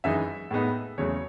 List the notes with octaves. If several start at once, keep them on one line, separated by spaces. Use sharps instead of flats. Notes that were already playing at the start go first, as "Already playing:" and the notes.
F#2 E3 G#3 D#4 E5
A2 G#3 B3 D#4
E2 C#3 F#3 A3 C#5